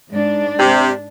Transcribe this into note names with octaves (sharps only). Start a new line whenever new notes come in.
G#2 D4
C3